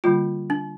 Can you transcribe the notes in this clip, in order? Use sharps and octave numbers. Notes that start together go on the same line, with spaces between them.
D3 G3 A#3 F4
D4